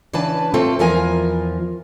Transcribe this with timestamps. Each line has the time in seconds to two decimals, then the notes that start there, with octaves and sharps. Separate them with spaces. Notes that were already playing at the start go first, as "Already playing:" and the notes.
0.13 C#3 E3 D4 B4 A5
0.54 A3 C4 F4 A4
0.79 E2 E3 F3 F4 A#4 G#5